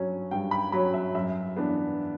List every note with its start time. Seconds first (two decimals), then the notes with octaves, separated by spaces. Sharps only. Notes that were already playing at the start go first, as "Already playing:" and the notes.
Already playing: G2 F#3 C#4
0.31 G2 G5
0.51 B5
0.72 F#3 C#4 B5
0.94 E5
1.15 F#2 E5
1.57 E3 B3 D4